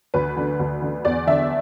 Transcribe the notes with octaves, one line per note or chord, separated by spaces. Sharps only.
D2 B4
D3
D2
D3
E2 D5
D3 E5